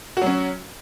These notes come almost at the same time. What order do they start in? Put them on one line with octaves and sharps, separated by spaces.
F#4 F#3 C#4